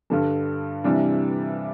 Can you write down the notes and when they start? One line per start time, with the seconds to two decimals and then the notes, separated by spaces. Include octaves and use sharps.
0.10 G2 D3 G3 A4
0.84 C3 E3 G3 D4